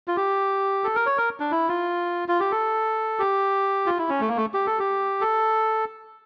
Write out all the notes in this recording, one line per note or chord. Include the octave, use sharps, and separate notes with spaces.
F4
G4
A4
A#4
C#5
A#4
D4
E4
F4
F4
G4
A4
G4
F4
E4
C#4
A3
A#3
A3
G4
A4
G4
A4